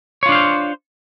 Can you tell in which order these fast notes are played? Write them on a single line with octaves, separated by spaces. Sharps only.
C#5 F4 D4 F5 C5